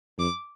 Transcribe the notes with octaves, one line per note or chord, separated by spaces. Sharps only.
F2 D6